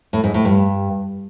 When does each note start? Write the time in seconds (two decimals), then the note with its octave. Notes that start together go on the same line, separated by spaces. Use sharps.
0.13 A2
0.24 G#2
0.34 A2
0.45 G2